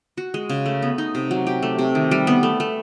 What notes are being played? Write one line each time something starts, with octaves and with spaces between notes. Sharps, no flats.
F#4
G#3
C#3
A3
B3
D#4
C3
F#3
G4
A3
C3
D#3
G3
B3
A3
A3